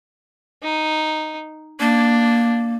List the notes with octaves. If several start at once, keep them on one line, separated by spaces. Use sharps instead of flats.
D#4
A#3 D4